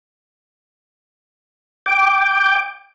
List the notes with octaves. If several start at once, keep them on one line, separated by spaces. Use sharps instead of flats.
G5 D6